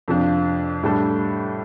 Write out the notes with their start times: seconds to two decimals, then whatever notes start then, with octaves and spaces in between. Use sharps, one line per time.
0.08 F2 C3 F3 D4
0.83 A2 G3 D4 A4